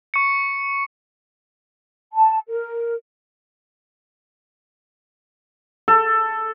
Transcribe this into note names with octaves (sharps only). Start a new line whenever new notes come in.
C#6 C#7
A5
A#4
A4